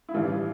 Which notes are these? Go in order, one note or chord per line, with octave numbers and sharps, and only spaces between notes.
E4
A1 G2 E3 F4